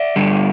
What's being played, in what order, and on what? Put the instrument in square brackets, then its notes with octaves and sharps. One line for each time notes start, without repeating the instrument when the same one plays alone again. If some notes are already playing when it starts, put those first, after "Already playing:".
Already playing: [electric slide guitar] D5 E5
G2 D3 G3